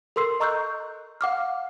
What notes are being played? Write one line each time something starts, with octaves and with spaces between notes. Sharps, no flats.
A4 A#4 C6 E6 C7
D#5 A#5 C#6 E6 F#6 G6
F5 F#5 D6 F6